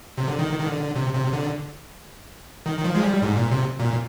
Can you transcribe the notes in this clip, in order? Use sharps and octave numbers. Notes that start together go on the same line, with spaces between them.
C3
D3
D#3
D#3
D3
C3
C3
D3
D#3
D#3
F3
G#3
G3
G#2
A#2
C3
A#2